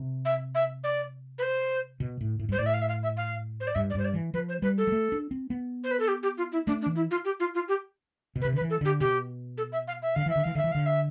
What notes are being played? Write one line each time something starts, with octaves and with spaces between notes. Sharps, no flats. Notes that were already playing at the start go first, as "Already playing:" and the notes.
Already playing: C3
E5
E5
D5
B4
C5
B2
A2
A2
G2 C5
A2 D5
E5
F5
E5
F5
E5
F5
C5
D5
G2 E5
D5
G2 C5
D5
E3
F3 B4
C5
G3 B4
A4
G3
A3
D4
C4
B3
C5
B4
A4
G4
G4
F4
E4
A3 D4
D4
E3
E4
F4
G4
F4
F4
G4
B2
B4
C3
D3
B4
E3
A4
D3 G4
B2 G4
A4
E5
F5
E5
D3 F5
E3 E5
D3
E3 F5
D3 E5
E3
D3 F5
E5